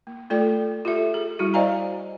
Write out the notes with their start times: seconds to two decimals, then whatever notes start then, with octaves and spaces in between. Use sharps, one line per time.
0.07 A#3
0.30 A3 F4 A4 D5 G5
0.85 F4 G4 A4 E5
1.14 G#4
1.39 G3 E4 F#4
1.54 C5 D5 D#5 F5 G#5 A#5